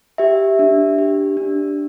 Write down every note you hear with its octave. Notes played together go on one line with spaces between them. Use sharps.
G4 E5
D4
G4
D4